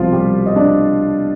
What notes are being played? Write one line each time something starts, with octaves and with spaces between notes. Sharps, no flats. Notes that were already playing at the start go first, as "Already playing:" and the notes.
Already playing: C2 B2 F3 G3 F4
G3 G4
D#5
D4 D5